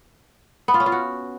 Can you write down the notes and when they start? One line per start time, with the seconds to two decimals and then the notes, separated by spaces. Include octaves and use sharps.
0.68 B3
0.74 F4
0.80 C#4
0.86 F4
0.92 F#4